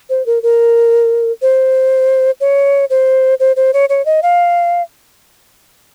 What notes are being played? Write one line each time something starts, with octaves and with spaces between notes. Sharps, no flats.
C5
A#4
A#4
C5
C#5
C5
C5
C5
C#5
C#5
D#5
F5